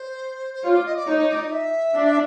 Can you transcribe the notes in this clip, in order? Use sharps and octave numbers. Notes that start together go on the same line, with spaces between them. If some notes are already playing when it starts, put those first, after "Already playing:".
Already playing: C5
C5
F4 C#5
D5
D#5
D5
D#4 C#5
C#5
D5
D#5
E5
D4